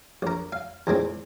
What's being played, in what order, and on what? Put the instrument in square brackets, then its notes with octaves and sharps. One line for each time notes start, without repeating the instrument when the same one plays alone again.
[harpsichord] A#1 A#4
F5
E2 A#2 G#3 C4